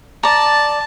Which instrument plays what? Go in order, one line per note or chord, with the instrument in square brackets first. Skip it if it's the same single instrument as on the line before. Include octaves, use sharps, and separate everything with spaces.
[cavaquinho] D5 A#5 [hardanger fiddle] A5